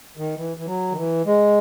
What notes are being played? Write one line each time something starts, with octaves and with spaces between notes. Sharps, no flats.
D#3
E3
E3
F#3
D#3
E3
G#3